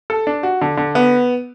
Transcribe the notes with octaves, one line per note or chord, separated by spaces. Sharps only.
A4
D4
F#4
D3
D3
B3